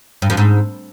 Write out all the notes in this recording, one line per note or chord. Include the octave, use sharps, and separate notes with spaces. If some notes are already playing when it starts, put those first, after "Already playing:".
G2
F2
G#2